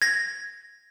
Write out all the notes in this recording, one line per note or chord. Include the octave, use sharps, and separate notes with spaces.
G#6 A#6